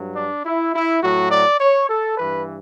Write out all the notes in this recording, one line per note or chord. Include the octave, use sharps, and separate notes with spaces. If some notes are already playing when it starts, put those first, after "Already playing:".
Already playing: G2 F#3
D4
E4
E4
A2 F#3 F#4
D5
C#5
A4
G2 E3 B4